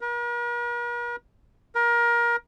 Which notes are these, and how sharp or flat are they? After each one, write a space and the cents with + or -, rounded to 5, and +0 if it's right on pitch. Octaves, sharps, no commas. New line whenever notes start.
A#4 +45
A#4 +25